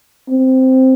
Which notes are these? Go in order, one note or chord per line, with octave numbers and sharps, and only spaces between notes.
C4